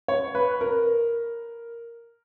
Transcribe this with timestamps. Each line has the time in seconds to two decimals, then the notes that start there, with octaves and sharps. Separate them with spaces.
0.08 C#5
0.35 B4
0.61 A#4